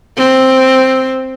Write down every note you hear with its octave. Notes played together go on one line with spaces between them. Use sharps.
C4